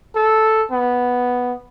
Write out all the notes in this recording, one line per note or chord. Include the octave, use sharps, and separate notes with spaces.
A4
B3